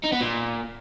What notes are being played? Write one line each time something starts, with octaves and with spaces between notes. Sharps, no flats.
D#4
B3
A#2